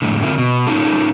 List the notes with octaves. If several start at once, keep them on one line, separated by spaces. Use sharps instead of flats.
F2 A2 D3
F2 D3 C4 F4 A#4 E5
B2
A#3 C#4 D#4 F4 A4